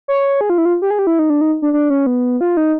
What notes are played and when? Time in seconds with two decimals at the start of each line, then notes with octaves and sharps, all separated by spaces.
0.08 C#5
0.41 G#4
0.50 F4
0.58 E4
0.65 F4
0.82 G4
0.91 G#4
0.99 G4
1.07 E4
1.19 D#4
1.30 D4
1.41 D#4
1.62 D4
1.73 D4
1.90 C#4
2.06 B3
2.41 F4
2.57 D#4